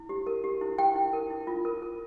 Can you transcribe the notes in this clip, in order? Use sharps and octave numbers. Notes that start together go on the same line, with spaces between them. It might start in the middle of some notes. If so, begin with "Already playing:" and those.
Already playing: E4
G4
A#4
G4
E4
G4 G5
E4
A#4
E4
F4
A#4
A#4